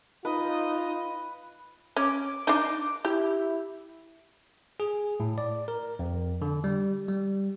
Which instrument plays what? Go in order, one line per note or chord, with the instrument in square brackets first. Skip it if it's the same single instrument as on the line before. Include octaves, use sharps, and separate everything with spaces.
[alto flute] D#4 [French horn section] F4 [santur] B4 [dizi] D#5
[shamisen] C#4 [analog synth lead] D6
[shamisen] D4 D#4
[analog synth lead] E4 [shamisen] G4
[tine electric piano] G#4
A2
D5
A#4
F2
D3
G3
G3